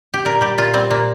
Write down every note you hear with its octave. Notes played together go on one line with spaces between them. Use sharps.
G4
A#2 A#4
G3 G4
A#2 F4
G3 C4
A#2 A#3